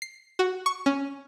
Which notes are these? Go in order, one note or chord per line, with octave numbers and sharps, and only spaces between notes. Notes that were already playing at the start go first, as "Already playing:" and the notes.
C7
F#4
C#6
C#4